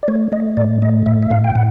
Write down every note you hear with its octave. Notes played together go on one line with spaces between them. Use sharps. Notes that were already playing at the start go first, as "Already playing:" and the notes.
D5
A3 C#5
A3 D#5
A2 D5
A3 D#5
A2 E5
E5
A2 F5
G5
A2 F#5